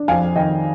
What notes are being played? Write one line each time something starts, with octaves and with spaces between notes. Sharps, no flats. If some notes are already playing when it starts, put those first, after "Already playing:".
Already playing: D4
F2 F5 G#5
D#3 D#5 G5